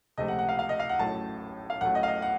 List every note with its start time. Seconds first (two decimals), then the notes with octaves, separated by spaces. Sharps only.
0.18 C#2 C3 F3 A3 D#5
0.28 F#5
0.39 F#5
0.49 F5
0.59 F5
0.69 D#5
0.79 F5
0.89 F#5
0.99 A1 A2 F#3 A3 A5
1.70 F5
1.81 A1 A2 F#3 A3 F#5
1.95 D#5
2.03 F5
2.08 D#5
2.22 F#5